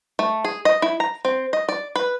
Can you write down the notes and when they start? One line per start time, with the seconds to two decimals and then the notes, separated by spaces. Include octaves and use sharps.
0.19 A3
0.45 G#4
0.65 D#5
0.82 E4
1.00 A#5
1.25 C4
1.53 D#5
1.69 D5
1.96 B4